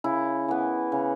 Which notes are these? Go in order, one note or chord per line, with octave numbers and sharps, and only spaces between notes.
C#3 E4
E3 B3
C#3